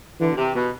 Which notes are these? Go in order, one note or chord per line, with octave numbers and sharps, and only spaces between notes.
D3 E3
B2
C3
B2